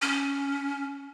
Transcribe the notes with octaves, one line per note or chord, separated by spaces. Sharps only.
C#4